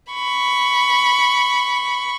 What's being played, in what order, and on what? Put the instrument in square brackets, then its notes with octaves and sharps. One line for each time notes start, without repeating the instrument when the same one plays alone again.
[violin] B5 C#6